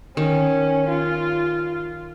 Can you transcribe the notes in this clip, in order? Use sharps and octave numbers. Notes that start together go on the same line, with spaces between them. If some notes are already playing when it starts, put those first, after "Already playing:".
D#3 C#4
F4